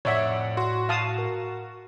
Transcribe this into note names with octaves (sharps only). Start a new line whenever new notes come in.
F2 A2 C#5 D5 E5 F#5
F#4 C6
F5 A5 D#6
A#4